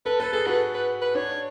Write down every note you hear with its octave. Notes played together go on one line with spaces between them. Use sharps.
A4 B4
A4 B4
G#4 A4
F#4 B4
B4
B4
D4 C#5